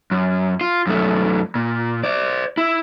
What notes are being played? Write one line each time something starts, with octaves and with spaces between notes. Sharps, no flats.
F#2
F4
F#2 A3
A#2
C5 D5
E4